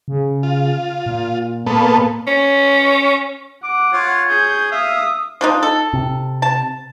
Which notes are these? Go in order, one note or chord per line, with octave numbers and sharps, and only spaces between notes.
C#3
F4
A#2
A#2 A#3 B3 A4
C#4
F#5 D6
F4 C#5
G#4 G6
E5 F5 D#6
F3 D4 D#4
A4
C3
A5